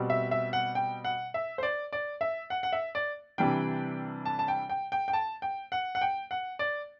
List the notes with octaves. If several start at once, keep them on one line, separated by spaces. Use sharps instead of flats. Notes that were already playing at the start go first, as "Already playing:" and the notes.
Already playing: B2 G3 C4
E5
E5
F#5
G5
F#5
E5
C5
D5
D5
E5
F#5
F#5
E5
D5
C3 E3 G3 D4 G5
A5
A5
G5
G5
G5
G5
A5
G5
F#5
F#5
G5
F#5
D5